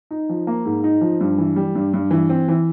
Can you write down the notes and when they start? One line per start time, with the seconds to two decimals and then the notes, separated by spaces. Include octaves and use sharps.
0.11 D#4
0.29 F3
0.47 A#3
0.65 G#2
0.84 D#4
1.01 F3
1.21 G2
1.38 E3
1.56 G3
1.75 G2
1.93 G2
2.11 E3
2.30 C4
2.48 E3